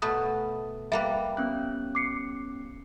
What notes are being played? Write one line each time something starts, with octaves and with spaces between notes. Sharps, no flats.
B2 A3 B4 D#6
G3 A#3 B4 E5
B3 C#4 F#6
D6 C7 C#7